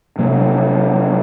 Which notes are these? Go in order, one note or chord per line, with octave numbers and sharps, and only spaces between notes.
C3 F#3 A#3